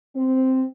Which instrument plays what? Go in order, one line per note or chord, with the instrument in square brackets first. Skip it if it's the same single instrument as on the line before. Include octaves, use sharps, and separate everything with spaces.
[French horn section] C4